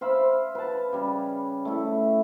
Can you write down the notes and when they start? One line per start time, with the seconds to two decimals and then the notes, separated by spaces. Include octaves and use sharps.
0.01 C5 E5 F5 B5
0.55 B4 A5
0.93 C#3 G3
1.65 A3 E4